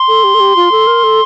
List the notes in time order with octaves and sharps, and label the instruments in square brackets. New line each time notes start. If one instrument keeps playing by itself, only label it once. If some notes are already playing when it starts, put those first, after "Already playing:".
Already playing: [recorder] C6
[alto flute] A4
G4
A4
G4
F4
A4
A#4
A4